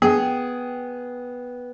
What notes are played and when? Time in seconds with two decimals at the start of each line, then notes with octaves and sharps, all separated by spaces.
0.02 B3 G#4 G5